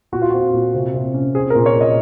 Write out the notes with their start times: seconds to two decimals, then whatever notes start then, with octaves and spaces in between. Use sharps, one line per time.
0.12 A#2 F#4
0.22 F4
0.30 C4 F#4
0.54 A#2
0.74 C3
0.94 C3
1.14 C#4
1.35 C4 G#4
1.50 A#4
1.55 A#2
1.66 C#5
1.76 A#2
1.81 D#5